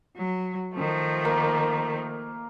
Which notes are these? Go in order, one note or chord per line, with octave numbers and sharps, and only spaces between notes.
F#3
D#3 F3 A3
A#3